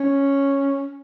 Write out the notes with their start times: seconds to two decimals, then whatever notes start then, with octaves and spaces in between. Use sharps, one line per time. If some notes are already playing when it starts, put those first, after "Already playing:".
Already playing: C#4